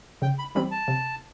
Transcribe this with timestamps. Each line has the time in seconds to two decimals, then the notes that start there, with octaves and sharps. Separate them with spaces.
0.22 C#3 G5
0.39 B5
0.55 E3 G3 C4 B5
0.71 A5
0.88 C3